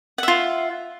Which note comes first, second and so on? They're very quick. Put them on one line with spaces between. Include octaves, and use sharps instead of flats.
F#5 E5 F4